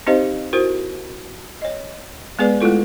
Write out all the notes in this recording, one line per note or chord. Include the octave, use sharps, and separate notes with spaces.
C4 D#4 G4 C5 D#5 F5
E4 F#4 A#4 C5
C#5 D#5
G#3 B3 G#4 B4 D5
G#3 A3 E4 F4 A4